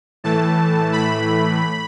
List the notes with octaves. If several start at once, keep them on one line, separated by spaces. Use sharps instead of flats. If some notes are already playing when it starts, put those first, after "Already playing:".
A2 E3 A3 A5
B5